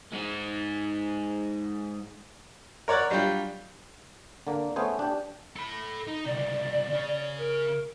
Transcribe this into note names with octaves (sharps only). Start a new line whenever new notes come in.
G#3 D#4
A#4 C#5 D5 F#5
F#3 G3 D4 F4 G4
D3 A#3
A3 B3 C#4 G#4 C5
D4 G4
A4 B5
D#4
C#2 C3 D5
C#3 C#4
A#4